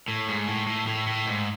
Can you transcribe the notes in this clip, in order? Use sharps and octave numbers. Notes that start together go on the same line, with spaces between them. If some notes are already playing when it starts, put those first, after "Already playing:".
A2
G#2
A2
A2
A2
A2
G#2